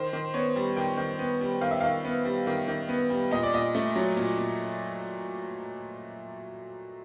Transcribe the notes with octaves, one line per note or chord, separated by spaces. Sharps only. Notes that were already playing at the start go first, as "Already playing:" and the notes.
Already playing: D#3 C5
D#3
B3 C#5
G3
D#3 G5
D#3
B3
G3
D#3 F5
E5
D#3 F5
B3
G3
D#3
D#3
B3
G3
A#2 D#5
D5
A#2 D#5
A3
F#3
A#2
A#2